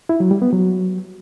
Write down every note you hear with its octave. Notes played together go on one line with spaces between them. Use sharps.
E4
F#3
G3
B3
F#3